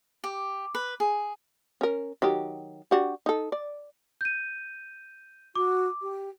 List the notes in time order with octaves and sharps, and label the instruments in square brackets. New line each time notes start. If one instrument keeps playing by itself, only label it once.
[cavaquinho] G4
B4
G#4
[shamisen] C#4 A#4
D#3 F#3 G4
D4 F#4 G4
D#4 A4
D5
[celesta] G6 D#7
[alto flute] F#4 [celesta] D6
[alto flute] G4